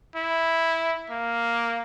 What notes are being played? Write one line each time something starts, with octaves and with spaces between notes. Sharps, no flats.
E4
A#3